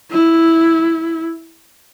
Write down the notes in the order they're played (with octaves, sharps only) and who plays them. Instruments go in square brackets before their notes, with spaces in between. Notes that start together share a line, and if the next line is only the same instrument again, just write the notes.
[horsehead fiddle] E4